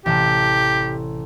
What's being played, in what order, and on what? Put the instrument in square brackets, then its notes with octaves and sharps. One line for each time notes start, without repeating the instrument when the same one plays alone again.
[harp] A1 C3 A5 [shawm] G4